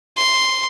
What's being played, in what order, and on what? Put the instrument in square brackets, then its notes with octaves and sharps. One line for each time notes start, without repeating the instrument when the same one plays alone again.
[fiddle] C6